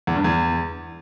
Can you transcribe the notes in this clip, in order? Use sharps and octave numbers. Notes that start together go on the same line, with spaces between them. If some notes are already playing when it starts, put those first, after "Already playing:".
E2
G2
E2